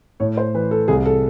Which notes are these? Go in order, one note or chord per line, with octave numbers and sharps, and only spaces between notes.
A2 C#5
C5
E3 B4
A4
C2 G#4
A4